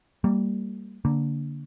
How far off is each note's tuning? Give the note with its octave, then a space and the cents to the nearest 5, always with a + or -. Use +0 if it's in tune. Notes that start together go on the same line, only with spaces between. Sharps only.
G3 +0 A#3 -20
D3 -15 A#3 +0